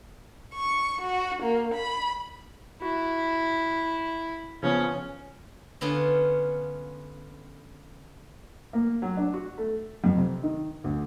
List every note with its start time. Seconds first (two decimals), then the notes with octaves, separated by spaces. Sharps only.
0.54 C#6
1.00 F#4
1.42 A#3
1.74 B5
2.82 E4 F#4
4.63 C#3 F3 B3 C#4
5.81 D3 B3 C#4 F4
8.73 A#3
9.02 F#3
9.17 D4
9.34 F#4
9.58 A3
10.04 F2
10.17 C3
10.43 D#3
10.84 D2